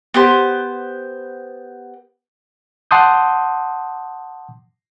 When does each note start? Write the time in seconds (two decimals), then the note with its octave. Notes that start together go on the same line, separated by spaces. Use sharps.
0.14 B3 G4 C5
2.91 F#5 A5 C6 D6 D#6 G6